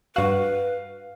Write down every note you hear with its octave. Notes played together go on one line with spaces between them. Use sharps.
G2 F#4 B4 F5